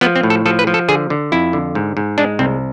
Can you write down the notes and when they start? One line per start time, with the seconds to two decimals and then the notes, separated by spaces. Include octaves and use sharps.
0.01 F3 B3
0.16 C4
0.23 A2
0.30 A4
0.46 F3 A4
0.59 B4
0.67 F3
0.74 A4
0.88 D3 G#4
1.10 D3
1.32 F2 E4
1.53 D3
1.75 G#2
1.97 G#2
2.18 G#3 D4
2.39 C2 C4